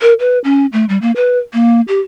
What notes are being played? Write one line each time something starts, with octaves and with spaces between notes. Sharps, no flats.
A#4
B4
C#4
A3
G3
A#3
B4
A#3
G4